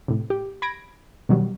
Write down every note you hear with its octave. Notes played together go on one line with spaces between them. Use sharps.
A2 C3
G4
B5 G#6 A#6 D7
B2 D#3 F#3 G3